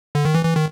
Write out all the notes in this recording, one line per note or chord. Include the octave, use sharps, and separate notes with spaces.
D3
D#3
E3
E3
D#3